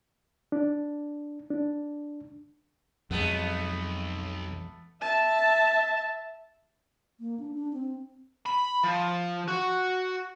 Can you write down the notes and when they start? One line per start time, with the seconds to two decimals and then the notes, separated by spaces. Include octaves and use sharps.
0.52 D4
1.50 D4
3.11 B1 F2 G#3 A3 B3
5.01 E5 A5
7.19 A#3
7.40 D4
7.54 D4
7.73 C4
8.46 B5
8.84 F3
9.48 F#4